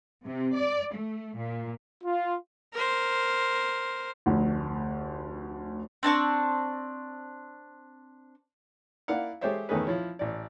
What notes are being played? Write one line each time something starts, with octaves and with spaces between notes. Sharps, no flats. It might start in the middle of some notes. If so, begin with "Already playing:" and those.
C3
D5
A3
A#2
F4
A#4 C5
F1 D2
C4 D4 A5 C#6
A#3 E4 D5 F5 F#5
G#3 G4 A4 C5 C#5 E5
E2 D#3 A3 C#4 G#4 B4
F3 E4 C#5
A1 D5